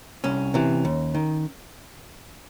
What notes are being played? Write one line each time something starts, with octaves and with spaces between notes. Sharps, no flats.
C2 C#4
C3 E3
D#2
D#3